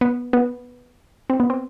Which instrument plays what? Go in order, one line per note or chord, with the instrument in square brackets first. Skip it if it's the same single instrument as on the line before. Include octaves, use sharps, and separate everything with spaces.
[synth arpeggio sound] B3
B3
C4
B3
C4